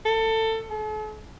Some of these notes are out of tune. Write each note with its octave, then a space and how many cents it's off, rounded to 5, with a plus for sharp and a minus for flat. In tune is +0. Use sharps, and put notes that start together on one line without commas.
A4 +20
A4 -45